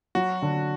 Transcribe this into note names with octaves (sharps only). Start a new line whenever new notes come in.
F#3 F#4
D3